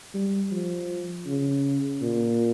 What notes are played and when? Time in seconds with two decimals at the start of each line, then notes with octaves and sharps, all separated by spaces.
0.14 G3
0.52 F3
1.27 C#3
2.01 A#2